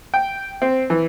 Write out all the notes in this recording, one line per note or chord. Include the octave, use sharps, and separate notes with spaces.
G5
C4
E3